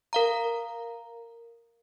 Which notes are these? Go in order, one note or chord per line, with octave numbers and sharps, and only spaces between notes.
A#4 F5 A#5